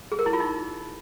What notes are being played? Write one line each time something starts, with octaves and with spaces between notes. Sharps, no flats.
G#4
A#4
E4
F4
D#4